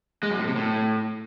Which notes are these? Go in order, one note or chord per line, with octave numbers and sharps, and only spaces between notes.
G#3
F#2
A2
C3
A2